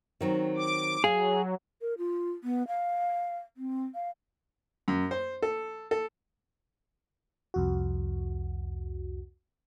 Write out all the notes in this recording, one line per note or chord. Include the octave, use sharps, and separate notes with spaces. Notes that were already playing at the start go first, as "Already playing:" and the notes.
D#3 F#3 C4
D6
F#3 G#4 F5
A#4
F4
B3
F5
C4
F5
F#2
C5
A4
A4
C2 F2 F#4